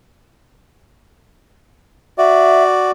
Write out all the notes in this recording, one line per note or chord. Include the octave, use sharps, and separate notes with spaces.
F#4 D5 E5